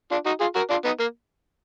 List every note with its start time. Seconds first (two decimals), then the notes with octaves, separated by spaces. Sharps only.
0.11 D4 F4
0.26 D#4 F#4
0.40 F4 G#4
0.55 F#4 A#4
0.70 D4 F4
0.85 B3 D#4
1.00 A#3